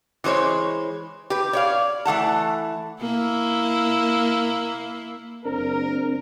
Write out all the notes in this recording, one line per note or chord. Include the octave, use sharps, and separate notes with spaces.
E3 G#3 C5 C#5
G4 B4
C#5 D5 F5
E3 A3 F#5 A5
A#3 E4
F#1 C4 D4 A#4